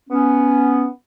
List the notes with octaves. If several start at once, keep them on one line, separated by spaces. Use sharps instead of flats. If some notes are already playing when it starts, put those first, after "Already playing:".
B3 C#4